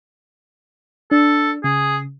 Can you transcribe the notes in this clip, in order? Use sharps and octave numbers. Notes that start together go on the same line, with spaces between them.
D4 A4
C#3 G#4